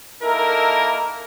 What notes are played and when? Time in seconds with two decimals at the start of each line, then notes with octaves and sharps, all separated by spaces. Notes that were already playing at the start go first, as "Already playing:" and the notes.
0.23 A#3 D#4 E4 A4 A#4